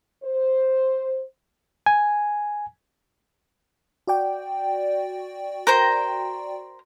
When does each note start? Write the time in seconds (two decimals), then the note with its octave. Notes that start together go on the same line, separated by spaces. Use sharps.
0.23 C5
1.86 G#5
4.07 F#4 D5 G5
5.67 A#4 C5 A#5